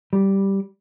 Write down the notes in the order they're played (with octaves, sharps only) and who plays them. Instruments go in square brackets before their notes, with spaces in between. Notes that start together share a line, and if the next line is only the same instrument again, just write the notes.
[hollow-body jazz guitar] G3